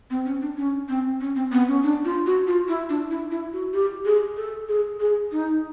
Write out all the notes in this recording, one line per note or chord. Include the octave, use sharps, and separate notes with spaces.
C4
C#4
D4
C#4
C4
C#4
C4
B3
C#4
D4
F4
F#4
F4
E4
D4
E4
E4
F#4
G4
G#4
A4
G#4
G#4
D#4